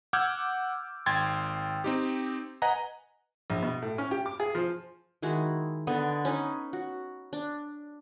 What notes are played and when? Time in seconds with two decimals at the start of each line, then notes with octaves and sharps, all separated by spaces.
0.13 F#5 D6 E6 F6 G6 G#6
1.06 G#1 G5 C6 G#6 A6
1.84 C4 D#4 G4
2.62 B4 D#5 F#5 G#5 A#5
3.50 A#1
3.62 B2
3.82 A2
3.98 C#4
4.11 G4
4.26 D6
4.40 G#4
4.55 F3
5.22 D#3 G#3 E4 F#4
5.87 D3 B3 A4 D#5
6.25 C#4 D#4 B4
6.73 F#4
7.33 D4